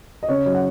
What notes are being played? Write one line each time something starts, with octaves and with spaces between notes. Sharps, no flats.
D#5
C#3 C#5
F#3
F#5